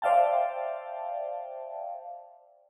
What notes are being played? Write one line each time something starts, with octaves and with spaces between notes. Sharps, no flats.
C5 D5 E5 F5 G5 A5